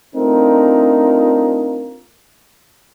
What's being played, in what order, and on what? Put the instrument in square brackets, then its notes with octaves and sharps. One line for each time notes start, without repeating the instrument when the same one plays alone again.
[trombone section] A3 C4 D4 D#4 F4 A#4